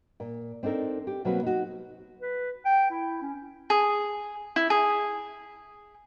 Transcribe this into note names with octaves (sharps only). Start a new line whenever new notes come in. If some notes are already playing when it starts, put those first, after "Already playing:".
A#2
C4 D4 D#4 A4 A#4
G4
B2 F#3 A#3 C4 F#4 B4
D#4 F#4
B4
G5
E4
C#4
G#4
E4
G#4